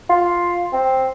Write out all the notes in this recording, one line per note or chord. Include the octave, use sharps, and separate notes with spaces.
F4
C4